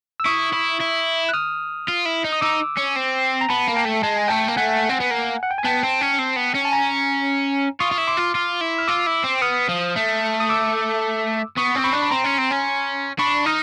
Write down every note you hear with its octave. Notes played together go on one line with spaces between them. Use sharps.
E6
E4 C#6 D#6
E4
E4
F#6
D#6 F6
F4
E4
D#4
D#6
D#4 D6 E6
C#4
C4
A#5
B3 A5 B5
A#3
G5 A5
A3
G#3 A5
G#5
A3 G5 A5
A#3
A3 F#5 G#5
C4
B3
A#3
F#5
G5
G#5
B3 G5 A5
C4
C#4
C4
B3
C#4
A5
G#5 A#5
F4 C#6 D#6
F4
E4
C6 D6
F4
F4
E4
F6
F4 D6 E6
E4
C4
B3 D#6 F6
F3
A3
D#6
D6 E6
B3 C#6 D#6
C4
B5 C#6
D4
B5
C4 A#5 C6
C#4
C4
C#4
D4 B5 C#6
D#4 D#6 F6